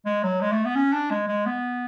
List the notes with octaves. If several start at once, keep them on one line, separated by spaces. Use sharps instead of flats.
G#3
F#3
G#3
A3
B3
C#4
D4
G#3
G#3
B3